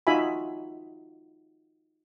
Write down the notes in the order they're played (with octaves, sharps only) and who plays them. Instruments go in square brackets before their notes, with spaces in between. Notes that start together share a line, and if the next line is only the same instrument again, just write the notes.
[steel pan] D#4 F4 F#4 E5 G#5 B5